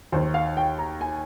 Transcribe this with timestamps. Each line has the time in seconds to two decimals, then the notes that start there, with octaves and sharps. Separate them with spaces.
0.12 D#2 D#3 C5
0.34 F5
0.57 G5
0.79 A#5
1.01 G#5